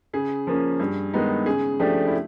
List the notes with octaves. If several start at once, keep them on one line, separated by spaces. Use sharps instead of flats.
C#3 G#4
F3 A#3 C#4
G2
D#3 G#3 B3 D#4
C#3 G#4
F3 A3 D4 G4
E4